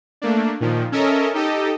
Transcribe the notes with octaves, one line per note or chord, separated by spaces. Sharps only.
A3 A#3 D4
A#2 D#3 F3
C#4 A4 A#4 D#5 E5
D#4 G4 A4 D#5